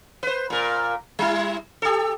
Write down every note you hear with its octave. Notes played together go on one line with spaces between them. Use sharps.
B4 C5
A#2 A#4
G3 E4
G4 A4